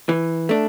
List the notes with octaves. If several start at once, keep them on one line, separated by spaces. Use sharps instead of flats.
E3
A3 D4